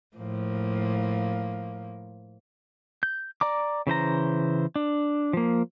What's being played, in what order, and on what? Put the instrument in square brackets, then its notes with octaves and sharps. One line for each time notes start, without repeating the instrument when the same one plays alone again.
[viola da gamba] A2 F3 A#3
[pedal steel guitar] G6
D5 A#5 D6
C#3 E3 C5 A#5
D4
F3 A#3